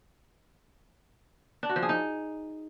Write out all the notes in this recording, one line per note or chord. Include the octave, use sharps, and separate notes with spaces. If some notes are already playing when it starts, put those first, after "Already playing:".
D4
F#4
F3
G#4
D#4